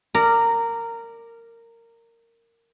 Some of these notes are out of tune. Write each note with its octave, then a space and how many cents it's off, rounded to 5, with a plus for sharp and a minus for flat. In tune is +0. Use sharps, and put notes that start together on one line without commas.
A#4 -15 D5 +5